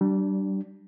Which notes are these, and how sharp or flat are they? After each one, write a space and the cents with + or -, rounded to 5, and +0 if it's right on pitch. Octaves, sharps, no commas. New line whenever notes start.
G3 -25 D4 +0